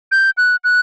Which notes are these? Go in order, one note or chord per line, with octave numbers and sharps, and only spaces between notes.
G6
F#6
F#6